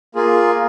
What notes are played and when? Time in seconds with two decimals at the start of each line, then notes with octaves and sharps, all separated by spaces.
0.15 A#3 F4 G#4